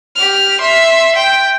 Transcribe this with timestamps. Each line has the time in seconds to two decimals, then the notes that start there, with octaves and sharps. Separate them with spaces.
0.16 G4 F6
0.61 E5 C6
1.16 G5